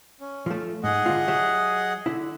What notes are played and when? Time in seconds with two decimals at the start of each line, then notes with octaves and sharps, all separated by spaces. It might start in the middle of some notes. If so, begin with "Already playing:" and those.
0.20 C#4
0.46 F3 A3
0.84 G#2 G#4 D#5 F#5
1.06 D3 F4
1.28 F#3 G4 E5
2.06 D3 E4